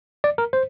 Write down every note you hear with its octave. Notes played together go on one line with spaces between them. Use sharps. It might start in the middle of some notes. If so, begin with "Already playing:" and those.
D5
A#4
C5